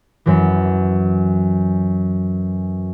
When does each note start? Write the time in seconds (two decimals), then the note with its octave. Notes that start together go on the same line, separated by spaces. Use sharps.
0.26 F#2 E3